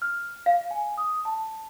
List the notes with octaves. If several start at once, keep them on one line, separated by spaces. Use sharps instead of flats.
F6
F5
G#5
D#6
A5